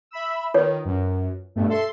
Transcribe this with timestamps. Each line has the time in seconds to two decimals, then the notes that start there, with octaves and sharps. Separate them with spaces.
0.11 E5 B5 E6
0.54 D#3 F4 B4 C#5
0.85 F#2
1.55 G2 B2 A3
1.69 A4 E5 C6